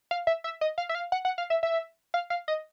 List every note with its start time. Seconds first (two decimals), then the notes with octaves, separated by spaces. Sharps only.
0.11 F5
0.27 E5
0.44 E5
0.61 D#5
0.78 F5
0.89 E5
0.95 F5
1.12 F#5
1.25 F#5
1.38 F5
1.50 E5
1.63 E5
2.14 F5
2.30 F5
2.48 D#5